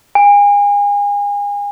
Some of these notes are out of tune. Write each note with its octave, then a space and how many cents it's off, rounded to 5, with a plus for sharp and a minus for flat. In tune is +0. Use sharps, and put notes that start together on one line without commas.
G#5 -35